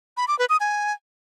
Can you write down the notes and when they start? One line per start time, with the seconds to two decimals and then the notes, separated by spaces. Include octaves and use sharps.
0.17 B5
0.28 D6
0.39 B4
0.49 D#6
0.60 G#5